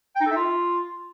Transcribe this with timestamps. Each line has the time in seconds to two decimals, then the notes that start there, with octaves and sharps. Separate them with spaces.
0.15 G5
0.21 D#4
0.26 A4
0.31 E5
0.36 F4